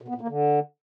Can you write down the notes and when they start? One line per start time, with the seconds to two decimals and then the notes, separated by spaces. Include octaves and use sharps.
0.02 B2
0.08 B3
0.15 A#2
0.21 A#3
0.28 D3